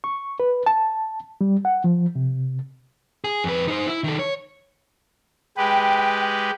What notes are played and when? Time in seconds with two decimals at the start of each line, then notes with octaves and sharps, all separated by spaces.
0.04 C#6
0.40 B4
0.66 A5
1.41 G3
1.65 F#5
1.84 F3
2.16 C3
3.24 G#4
3.44 F2 B4
3.68 D#4 C5
3.87 E4
4.04 D#3 A4
4.19 C#5
5.57 G#3 G4 B4 G5